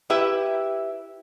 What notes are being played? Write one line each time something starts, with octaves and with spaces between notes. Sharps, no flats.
E4 G4 B4 E5